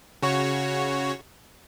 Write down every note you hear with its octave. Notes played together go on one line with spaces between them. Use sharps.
C#3 F#4 C#5